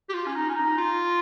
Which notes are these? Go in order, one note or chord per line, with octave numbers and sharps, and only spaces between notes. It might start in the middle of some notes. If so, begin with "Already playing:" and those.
G4
F4
C#4
D#4
C#4
D#4
F4